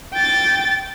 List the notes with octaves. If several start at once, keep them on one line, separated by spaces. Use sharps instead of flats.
G5 A6